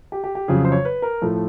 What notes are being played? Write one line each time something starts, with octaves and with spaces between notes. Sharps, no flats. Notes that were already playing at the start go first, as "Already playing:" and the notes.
G4
G4
G4
F2 C#3 F#3 G#4
C5
C#5
B4
A#4
A2 F3 A3